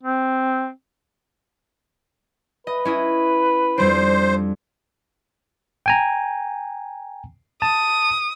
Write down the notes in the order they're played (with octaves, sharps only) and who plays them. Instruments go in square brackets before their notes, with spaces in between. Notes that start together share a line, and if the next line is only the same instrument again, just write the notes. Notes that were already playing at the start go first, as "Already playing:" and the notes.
[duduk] C4
[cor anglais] B4 [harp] D#5
[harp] C#4 E4 D#5
[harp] F2 G3 D4 [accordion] C5
[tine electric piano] G5 G#5 A#5
[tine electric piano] A5 [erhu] D#6